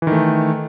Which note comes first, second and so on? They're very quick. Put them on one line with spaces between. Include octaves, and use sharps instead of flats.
E3 D#3 A3